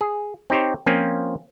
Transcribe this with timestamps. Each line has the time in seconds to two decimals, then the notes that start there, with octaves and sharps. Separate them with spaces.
0.01 G#4
0.50 C4 D#4 G4 C5 C#5
0.86 F3 A#3 C4 C#4 F4